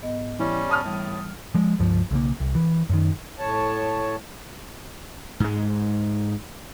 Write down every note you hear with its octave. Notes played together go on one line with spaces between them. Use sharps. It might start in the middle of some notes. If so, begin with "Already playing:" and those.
G#2 B3 D#5
E3 G3 C#4
A5 D#6 F6
A2 E3 G3
F3 G#3
C#2 G2 F3
B1 C#3 A#3
C2
E3
F#2 D#3
A2 C#5 A5
G#2 G#3